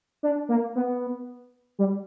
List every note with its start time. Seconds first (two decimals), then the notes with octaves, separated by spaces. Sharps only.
0.23 D4
0.49 A#3
0.76 B3
1.79 G3